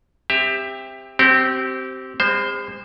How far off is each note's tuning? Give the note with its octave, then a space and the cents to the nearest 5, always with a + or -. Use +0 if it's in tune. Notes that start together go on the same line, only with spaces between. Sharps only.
C4 +0 G4 +20 E5 +0
C4 +0 G4 -30
G#3 -45 C5 +0